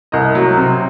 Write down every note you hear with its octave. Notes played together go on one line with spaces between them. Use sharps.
C2 D#5
F#3
C3